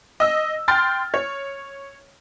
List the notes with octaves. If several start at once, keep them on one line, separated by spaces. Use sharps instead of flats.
D#5 E6
G5 C6 F6 A6
C#5